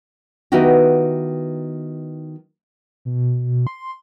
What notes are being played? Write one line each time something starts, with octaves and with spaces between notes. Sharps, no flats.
D#3 B3 D#4 E4 F#4 G4
B2
C6